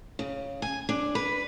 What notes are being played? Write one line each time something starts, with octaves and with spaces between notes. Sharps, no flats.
C#3
G#5
D4
B4